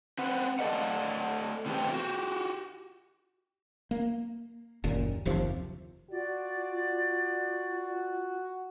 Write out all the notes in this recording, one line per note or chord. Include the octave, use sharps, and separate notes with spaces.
C4 B4 F#5
A3 A4 D5 D#5 F#5
C3 E3 A3 B3 G4
F#4 G4
A#3
F#1 D#2 A#2
F#1 D#2 C3 F3
F4 F#4 D5